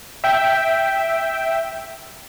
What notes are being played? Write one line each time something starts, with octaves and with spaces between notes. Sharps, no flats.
E5 G5